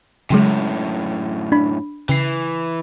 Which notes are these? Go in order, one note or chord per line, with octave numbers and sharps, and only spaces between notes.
F#2 A2 C#3 F#3 G#3
D4 B5
C#3 E3 C7